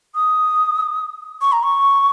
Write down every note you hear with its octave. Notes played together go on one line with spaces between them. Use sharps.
D#6
C#6
A#5
C#6